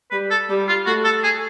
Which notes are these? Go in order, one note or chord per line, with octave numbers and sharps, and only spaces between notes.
G3 B4
A4
G3
F4
A3 F#4
A4
G#4